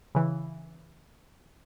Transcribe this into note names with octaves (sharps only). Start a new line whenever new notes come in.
C#3 E3